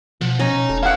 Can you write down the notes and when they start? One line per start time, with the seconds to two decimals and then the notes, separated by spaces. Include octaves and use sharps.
0.21 B2 F3 F#5
0.39 C#4 D#4 D#5 A#5
0.53 B2
0.69 E1 A3
0.83 E4 F5 F#5